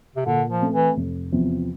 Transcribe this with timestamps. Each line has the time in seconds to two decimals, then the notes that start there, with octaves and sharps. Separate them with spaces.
0.16 C3
0.26 A#2 D3
0.50 F3
0.61 A3 C4
0.73 E3
0.96 F1
1.32 E2 C3 F3 C4